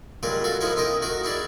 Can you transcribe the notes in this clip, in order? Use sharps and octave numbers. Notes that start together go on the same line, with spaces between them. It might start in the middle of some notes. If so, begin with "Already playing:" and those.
C#2 F#3 G3 A#4 B5
F#4 A4 F5
F3 D#4 E4 A#4 C#5
C#4 D#4 A#4 D#5 G5
D#3 F#4 A#4 A#5
D#4 E4 G#4 D5